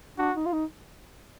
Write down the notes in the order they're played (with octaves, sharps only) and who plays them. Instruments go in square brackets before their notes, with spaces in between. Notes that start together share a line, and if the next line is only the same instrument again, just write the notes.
[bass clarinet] D4 [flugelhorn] F#4
[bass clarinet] D#4
F4
D#4